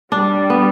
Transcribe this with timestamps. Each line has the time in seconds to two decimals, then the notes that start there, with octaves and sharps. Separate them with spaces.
0.12 G3 D4
0.50 B3